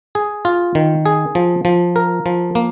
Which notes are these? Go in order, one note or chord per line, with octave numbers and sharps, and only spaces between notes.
G#4
F4
D#3
G#4
F3
F3
A#4
F3
A#3